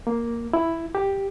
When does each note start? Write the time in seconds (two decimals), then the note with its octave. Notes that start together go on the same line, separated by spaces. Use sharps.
0.07 A#3
0.53 E4
0.95 G4